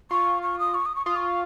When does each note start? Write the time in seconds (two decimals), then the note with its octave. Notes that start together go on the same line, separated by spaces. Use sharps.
0.11 F4 C#6
0.42 C#6
0.59 D#6
0.74 C#6
0.86 D#6
0.96 C#6
1.05 F4 D#6
1.16 C#6